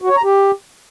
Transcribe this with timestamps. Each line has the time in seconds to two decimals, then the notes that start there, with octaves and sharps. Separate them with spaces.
0.02 F#4
0.09 C#5
0.16 A#5
0.24 G4